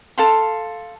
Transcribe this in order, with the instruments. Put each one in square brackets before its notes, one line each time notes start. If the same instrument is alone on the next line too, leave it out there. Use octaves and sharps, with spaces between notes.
[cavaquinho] A4 F5 C6